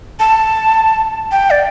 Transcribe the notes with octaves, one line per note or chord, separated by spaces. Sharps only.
A5
G5
D5